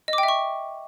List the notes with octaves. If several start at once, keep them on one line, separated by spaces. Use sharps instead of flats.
D#5
D6
G5
E5
C#6